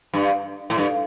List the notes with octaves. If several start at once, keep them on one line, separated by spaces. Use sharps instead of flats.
G2
A2
G2